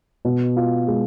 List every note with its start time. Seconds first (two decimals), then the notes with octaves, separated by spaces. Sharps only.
0.25 B2
0.57 F4
0.88 G#3